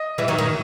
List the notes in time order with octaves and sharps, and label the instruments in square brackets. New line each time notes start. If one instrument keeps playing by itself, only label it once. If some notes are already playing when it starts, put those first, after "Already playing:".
Already playing: [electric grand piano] D#5
[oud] E3 G3 [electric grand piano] E5
[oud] D#3 F#3
D#3